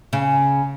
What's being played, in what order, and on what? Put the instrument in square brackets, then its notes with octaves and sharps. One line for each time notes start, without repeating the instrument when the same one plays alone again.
[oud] C#3